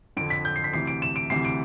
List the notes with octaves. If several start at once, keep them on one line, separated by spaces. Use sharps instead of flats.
F2 D3 D7
B6
G6
C7
B6
D2 C3 E3 C7
D7
E7
D7
D2 C3 E3 C7
D7